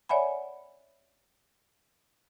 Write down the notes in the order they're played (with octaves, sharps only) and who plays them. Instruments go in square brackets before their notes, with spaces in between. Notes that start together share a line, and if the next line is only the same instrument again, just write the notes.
[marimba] C#5 D5 E5 F#5 G#5 B5